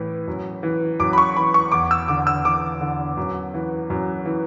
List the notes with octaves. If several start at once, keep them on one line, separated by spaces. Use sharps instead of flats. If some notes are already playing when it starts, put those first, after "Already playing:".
Already playing: A2 E3
F#2
E3
F#2 D6
B5
C#6
E3 B5
C#6
E2 D6
E6
D3 D6
E6
E2 D6
D3
F#2
E3
F#2
E3